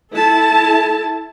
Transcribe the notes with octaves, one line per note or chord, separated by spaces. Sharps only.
E4 A4 A5